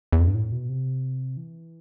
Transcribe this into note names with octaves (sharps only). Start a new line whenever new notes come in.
E2
F2
G2
A2
B2
C3
E3